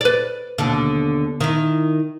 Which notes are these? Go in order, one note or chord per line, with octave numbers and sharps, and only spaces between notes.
B4 D5
D#2 B2 D3
D#3 E4